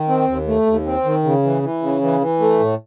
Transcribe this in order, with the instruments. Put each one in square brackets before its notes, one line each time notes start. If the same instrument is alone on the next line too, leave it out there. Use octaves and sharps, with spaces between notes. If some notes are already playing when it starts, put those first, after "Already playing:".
Already playing: [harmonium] D#3
C4
D#2
A3
D#2
C4
D#3
C#3
E3
E3
C#3
E3
E3
A3
A2